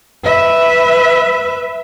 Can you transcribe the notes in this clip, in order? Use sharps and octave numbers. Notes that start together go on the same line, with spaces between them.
B4 E5